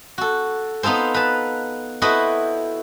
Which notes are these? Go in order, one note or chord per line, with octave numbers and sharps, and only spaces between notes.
F#4 A4
B3 D#4 F4 A4 C5
B4 A5
E4 F#4 A4 B4 C5 D#5